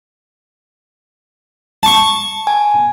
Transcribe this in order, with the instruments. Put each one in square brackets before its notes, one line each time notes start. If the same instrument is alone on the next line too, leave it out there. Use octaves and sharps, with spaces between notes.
[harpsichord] A5 C#6
[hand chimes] G#5